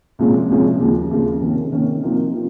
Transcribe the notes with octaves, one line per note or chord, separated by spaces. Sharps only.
C2 A#2 F3 G#3 C#4
C2 A#2 F3 G#3 C#4
D#2 C#3 F3
D#2 C#3 F3
C3 D#3 A#3 C#4
C3 D#3 A#3 C#4
C3 F3 A#3 D#4
C3 F3